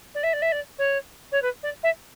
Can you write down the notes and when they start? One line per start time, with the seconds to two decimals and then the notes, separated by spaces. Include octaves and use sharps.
0.14 D5
0.23 E5
0.33 D5
0.42 E5
0.52 D5
0.78 C#5
1.31 C#5
1.42 B4
1.63 D5
1.83 E5